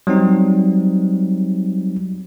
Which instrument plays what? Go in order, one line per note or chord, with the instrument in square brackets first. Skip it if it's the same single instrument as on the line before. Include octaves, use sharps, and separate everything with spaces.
[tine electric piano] F#3 G3 C4 D#4